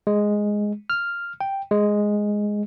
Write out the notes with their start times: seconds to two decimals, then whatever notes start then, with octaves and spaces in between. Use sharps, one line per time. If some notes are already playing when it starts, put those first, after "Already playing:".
0.07 G#3
0.90 F6
1.41 G5
1.71 G#3